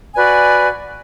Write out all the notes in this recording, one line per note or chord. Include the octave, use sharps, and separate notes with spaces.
F#4 B4 D5 G#5